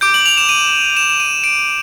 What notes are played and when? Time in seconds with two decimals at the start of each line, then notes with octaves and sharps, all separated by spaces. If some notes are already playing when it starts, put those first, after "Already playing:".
0.01 D6 G6 D7
0.14 F#7
0.26 F7
0.37 E7
0.49 D#7
0.97 E7
1.10 E7
1.20 D#7
1.44 D7